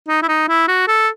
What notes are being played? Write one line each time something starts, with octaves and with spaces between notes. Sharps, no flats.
D#4
E4
D#4
E4
F#4
A4